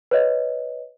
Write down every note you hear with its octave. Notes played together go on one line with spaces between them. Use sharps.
B4 C#5 D#5